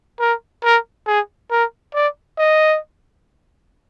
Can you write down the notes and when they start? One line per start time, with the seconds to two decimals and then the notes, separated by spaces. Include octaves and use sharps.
0.20 A#4
0.64 A#4
1.07 G#4
1.51 A#4
1.94 D5
2.38 D#5